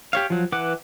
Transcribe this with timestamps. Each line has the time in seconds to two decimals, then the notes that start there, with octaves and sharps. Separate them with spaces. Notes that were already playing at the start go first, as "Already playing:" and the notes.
0.13 G4 C#5 F5
0.30 F3 F#3
0.52 E3 B4 F#5 D6